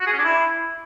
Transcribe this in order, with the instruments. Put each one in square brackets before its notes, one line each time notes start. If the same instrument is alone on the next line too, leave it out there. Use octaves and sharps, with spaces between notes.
[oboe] F#4
G#4
C#4
D4
E4